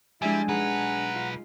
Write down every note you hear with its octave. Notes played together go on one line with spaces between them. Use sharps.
F3 G3 G#3 D4 E4 E5 G#5
B1 D#4 G#4 B4 F#5 A#5
F4